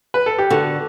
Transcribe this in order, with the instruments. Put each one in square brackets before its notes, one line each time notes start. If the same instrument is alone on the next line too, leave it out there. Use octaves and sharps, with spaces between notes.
[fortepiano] B4
A4
G4
[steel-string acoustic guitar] D3 [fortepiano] F#4